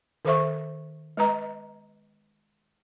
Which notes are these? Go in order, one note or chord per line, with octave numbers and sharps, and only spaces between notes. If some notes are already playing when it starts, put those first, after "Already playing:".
D#3 A4 C5 E5 C#6
G#3 B4 D#5 A#5